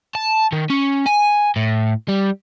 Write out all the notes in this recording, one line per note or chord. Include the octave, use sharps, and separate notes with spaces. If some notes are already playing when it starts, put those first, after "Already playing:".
A5
D#3
C#4
G#5
A2
G3